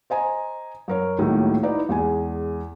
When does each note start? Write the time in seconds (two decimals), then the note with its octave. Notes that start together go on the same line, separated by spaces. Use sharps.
0.10 C5 D#5 G#5 A#5
0.88 F#2 A#4 C#5
1.19 C#2 A2 D#3 F#3 A#3
1.63 D#4 E4 B4 D5
1.89 E2 G#3 G#5